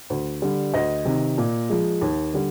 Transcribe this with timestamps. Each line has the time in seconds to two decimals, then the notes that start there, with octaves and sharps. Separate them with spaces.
0.10 D2
0.42 D3 G3
0.74 D2 D#5
1.05 C3 D#3
1.38 A#2
1.70 F3 G#3
2.01 D#2
2.34 D3 G3